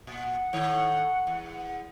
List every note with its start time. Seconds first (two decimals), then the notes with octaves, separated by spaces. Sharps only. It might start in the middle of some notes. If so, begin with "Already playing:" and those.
0.07 A#2 F#5
0.53 A2 D#3 C#5
1.27 E2